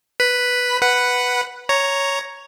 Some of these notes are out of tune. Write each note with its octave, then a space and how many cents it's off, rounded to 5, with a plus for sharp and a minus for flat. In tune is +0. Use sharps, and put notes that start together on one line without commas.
B4 +0 B5 +0
B4 +0 F#5 +0
C#5 +0 A#5 +0